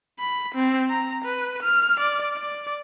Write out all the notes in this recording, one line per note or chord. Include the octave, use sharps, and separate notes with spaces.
B5
C4
A#5
B4
F6
D5
D5